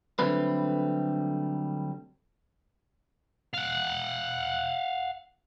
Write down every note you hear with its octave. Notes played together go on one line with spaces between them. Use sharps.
D3 F#3 G3 A3 C4 B4
F5 F#5